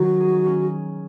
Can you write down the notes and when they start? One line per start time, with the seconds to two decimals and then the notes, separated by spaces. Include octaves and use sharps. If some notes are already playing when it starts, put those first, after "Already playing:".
Already playing: D#3 F#3 C#4 F#4
0.20 G#4
0.46 C#4